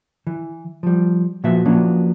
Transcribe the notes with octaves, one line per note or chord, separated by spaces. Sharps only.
E3
F3 G3
A#2 F3 B3 F#4 E5
F3 F#3 A#3 B3 C#4 D4